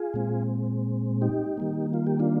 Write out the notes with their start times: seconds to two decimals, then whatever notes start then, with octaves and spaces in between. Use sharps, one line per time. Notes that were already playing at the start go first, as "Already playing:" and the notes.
Already playing: F4 G#4
0.14 A#2 G#3 C4
1.22 D#4 G4
1.57 D#3 G3 A#3
1.94 F4
2.07 G4
2.19 D4 F4